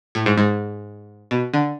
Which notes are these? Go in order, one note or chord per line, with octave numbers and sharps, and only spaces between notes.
A2
G#2
G#2
B2
D3